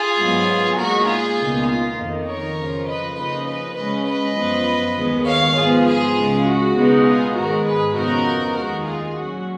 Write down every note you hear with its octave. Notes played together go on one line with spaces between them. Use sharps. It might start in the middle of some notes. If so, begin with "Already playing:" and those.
Already playing: F4 G#4
G#2 F#3 B3
A#2 G#3 D#4 F#4 A#4
F4 G#4
C#2 B2 A#3 D#4
F4
F2 D#3 A#3 D#4
A#4 C#5
F2 C#3 F3
B4 D#5
C#3 F3 A#3 D#4 B4 D#5
B4 D#5
C#3 G#3 C#4 B4 D#5
B4 D#5
F#2 F3 B3
D#2 D#3 G#3 B3
C#5 F5
G#2 F3 B3 F4 G#4
F4 G#4
C#2 C#3 G#3
F#4
C#2 B2 G#3 B3 D#4
F4 G#4
G#2 D#3 G#3 F#4 A#4
G#4 B4
F2 C#3 F3 B3 D#4 F#4 A#4
D#2 D#3 G#3 D#4 F#4 A#4
F4 G#4
A#2 F#3 C#4 F#4